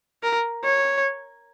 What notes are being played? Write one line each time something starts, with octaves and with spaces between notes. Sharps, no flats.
A#4
C#5